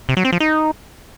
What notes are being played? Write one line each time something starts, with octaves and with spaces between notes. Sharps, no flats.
C3
F#3
C4
F3
D#4